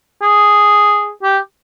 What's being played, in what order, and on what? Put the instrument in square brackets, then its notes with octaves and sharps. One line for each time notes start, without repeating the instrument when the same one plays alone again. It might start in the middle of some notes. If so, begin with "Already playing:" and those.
[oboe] G#4
G4